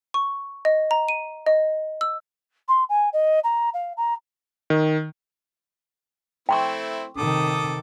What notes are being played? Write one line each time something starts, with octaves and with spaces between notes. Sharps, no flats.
C#6
D#5
A#5
D#7
D#5
E6
C6
G#5
D#5
A#5
F5
A#5
D#3
A3 C4 E4 G5 C6 C#6
C3 D#3 A4 D6 D#6